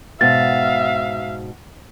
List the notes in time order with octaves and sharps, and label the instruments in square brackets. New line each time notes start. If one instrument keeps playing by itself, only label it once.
[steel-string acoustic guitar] G#2 B2 [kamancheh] E5 F5 [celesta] A6